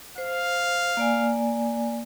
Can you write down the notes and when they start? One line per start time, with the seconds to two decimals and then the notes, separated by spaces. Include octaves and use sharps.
0.18 C5 F5
0.97 A#3 D5 G#5